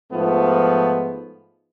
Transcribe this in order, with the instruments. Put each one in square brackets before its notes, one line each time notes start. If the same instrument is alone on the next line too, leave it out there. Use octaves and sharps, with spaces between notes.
[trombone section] G#2 F3 A3 B3